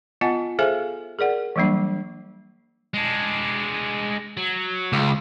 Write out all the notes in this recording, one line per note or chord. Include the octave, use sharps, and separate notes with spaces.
B3 F4 D#5 F#5 G#5
G#4 A4 C5 E5 F5 G#5
G#4 A#4 D5 F#5
E3 F#3 G3 A#3 D4
G#3 D4
F#3
C#2